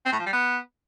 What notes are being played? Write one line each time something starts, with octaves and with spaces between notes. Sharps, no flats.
C4
A2
F3
G3
B3